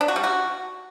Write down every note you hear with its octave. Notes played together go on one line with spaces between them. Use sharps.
D4
F#4
G3
F#4